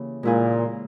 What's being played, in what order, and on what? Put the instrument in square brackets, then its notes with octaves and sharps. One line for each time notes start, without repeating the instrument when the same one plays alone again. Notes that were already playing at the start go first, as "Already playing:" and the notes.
Already playing: [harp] C#3 E3 A#3 G4
[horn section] A#2 [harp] G#3 E4 G#4